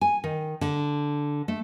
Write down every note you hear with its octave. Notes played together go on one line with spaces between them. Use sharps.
G#5
D#3
D3
A3